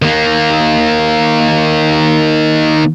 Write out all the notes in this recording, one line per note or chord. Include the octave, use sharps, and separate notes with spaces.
D#3 A#3